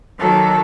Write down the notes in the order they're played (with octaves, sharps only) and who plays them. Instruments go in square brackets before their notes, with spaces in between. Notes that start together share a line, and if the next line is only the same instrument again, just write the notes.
[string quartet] D#3 F#3 A#3 A4